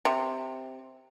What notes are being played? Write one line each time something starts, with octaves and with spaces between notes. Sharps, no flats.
C3